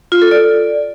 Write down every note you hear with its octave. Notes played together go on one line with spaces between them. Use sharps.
F4
A4
D5